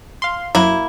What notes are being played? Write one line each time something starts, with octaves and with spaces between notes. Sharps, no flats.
F5 C6
F#2 F#3 A#3 E4